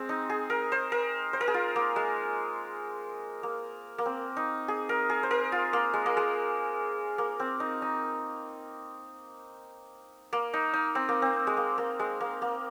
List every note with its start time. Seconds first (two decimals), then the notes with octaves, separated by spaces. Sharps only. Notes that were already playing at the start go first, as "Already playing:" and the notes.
Already playing: G#3 C4
0.09 D#4
0.29 G#4
0.50 A#4
0.72 C5
0.92 A#4
1.33 C5
1.41 A#4
1.48 G#4
1.54 F4
1.76 A#3
1.96 G#3
3.43 A#3
3.98 A#3
4.06 C4
4.37 D#4
4.68 G#4
4.89 A#4
5.10 G#4
5.23 C5
5.31 A#4
5.52 F4
5.73 A#3
5.94 G#3
6.06 A#3
6.17 G#3
7.18 A#3
7.40 C4
7.60 D#4
7.82 D#4
10.33 A#3
10.53 D#4
10.74 D#4
10.95 C4
11.09 A#3
11.22 C4
11.47 G#3
11.57 A#3
11.78 A#3
11.99 G#3
12.20 A#3
12.42 A#3